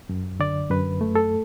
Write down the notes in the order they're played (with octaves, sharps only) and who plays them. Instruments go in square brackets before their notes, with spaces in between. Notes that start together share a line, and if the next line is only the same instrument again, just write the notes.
[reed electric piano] F#2
D3 D5
F#2 B4
A3
A4